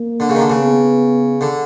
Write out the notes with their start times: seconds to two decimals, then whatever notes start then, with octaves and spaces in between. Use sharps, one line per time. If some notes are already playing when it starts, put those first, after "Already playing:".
Already playing: A#3
0.20 D3
0.29 C#3
0.35 D#3
0.40 D3
0.50 C#3
0.60 B3
1.41 D3